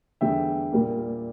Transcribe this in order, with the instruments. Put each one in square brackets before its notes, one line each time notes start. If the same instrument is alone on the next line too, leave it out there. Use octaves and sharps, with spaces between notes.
[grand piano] E2 D3 G3 E5 G5
A#2 G3 A#3